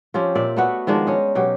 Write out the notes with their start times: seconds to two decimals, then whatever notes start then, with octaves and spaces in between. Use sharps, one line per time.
0.14 F3 C4 C#4 G4
0.35 A#2 D5 E5
0.56 A3 B3 F#4
0.87 D#3 F3 G#3 D4
1.07 C#4 D#4
1.35 B2 F#3 G4